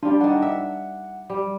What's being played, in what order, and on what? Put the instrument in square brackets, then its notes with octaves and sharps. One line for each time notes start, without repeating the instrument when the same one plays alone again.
[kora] G3 F4 [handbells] D4
[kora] D#3 D4 [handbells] F#5
[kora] E5
G3